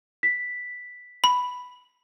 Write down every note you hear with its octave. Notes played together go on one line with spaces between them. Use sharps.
B6
B5